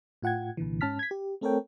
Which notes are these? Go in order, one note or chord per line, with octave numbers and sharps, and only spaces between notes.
A2 F4 F#5 G5 G#6
C2 A#2 D3 E3
G#2 C#4 A5 F6 B6
G#6 B6
G4
A3 C4 A4 A#4 C#5 G5